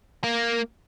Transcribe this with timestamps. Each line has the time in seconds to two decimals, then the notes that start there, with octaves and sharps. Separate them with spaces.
0.24 A#3